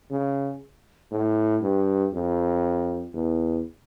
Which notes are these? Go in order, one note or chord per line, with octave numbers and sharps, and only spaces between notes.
C#3
A2
G2
F2
E2